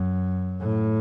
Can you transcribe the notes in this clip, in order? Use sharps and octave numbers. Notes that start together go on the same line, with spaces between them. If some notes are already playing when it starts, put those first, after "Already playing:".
Already playing: F#2
A2